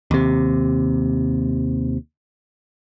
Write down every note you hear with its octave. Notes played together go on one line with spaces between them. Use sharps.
D#2 C3